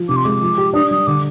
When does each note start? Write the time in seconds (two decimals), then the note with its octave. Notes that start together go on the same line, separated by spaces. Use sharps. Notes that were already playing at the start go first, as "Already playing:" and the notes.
Already playing: F3
0.09 C3 D6
0.16 C6
0.24 G#3 D6
0.42 F3
0.58 G4
0.73 D4 D#6
0.91 G3 D#6
1.07 D3 D6